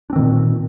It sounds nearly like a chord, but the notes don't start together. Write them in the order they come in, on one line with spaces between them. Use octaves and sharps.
D4 C4 D#3 A#2